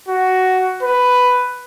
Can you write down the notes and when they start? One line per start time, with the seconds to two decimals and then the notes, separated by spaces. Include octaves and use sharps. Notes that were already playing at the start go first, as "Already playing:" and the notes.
0.08 F#4
0.83 B4